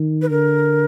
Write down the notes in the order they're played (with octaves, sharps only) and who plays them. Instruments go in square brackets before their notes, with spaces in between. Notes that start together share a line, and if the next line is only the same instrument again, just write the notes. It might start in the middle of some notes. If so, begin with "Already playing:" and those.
Already playing: [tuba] D#3
[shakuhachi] B4
[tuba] D3 [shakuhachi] A#4